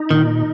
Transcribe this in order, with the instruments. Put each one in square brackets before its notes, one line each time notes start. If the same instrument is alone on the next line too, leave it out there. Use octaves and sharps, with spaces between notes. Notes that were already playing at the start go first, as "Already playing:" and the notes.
Already playing: [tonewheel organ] D#4
[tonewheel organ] A#2 [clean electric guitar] D#3